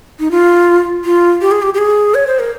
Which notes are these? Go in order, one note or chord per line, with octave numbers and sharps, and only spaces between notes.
D#4
F4
F4
G4
G#4
G4
G4
G#4
C#5
C5
A#4